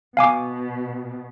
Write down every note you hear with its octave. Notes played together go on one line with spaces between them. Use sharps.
B2 F5 G#5 D6